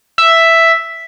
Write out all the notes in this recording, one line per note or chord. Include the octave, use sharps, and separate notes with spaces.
E5